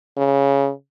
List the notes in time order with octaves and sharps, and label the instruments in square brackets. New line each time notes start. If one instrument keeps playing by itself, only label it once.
[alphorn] C#3